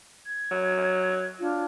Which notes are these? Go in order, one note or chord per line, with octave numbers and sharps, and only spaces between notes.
G#6
F#3
D4 F4